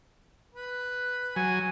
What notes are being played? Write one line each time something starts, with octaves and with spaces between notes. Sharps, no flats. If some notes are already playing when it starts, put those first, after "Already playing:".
B4
F#3 G#5